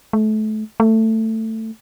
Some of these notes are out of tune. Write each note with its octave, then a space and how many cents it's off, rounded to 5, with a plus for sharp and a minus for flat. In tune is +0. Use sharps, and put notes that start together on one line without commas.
A3 -30
A3 +15